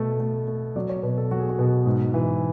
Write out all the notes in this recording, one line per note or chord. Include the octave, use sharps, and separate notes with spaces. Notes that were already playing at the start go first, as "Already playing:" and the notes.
Already playing: B2 A3
A3
A3
F#3 D5
C#5
B2 B4
A4
F#3 F#4
G#4
F#4
B2
G#2
E3